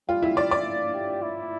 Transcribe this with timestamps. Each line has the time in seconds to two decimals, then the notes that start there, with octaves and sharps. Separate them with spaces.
0.09 G3 F4
0.22 E4
0.37 D5
0.51 D5
0.94 G4
1.22 E4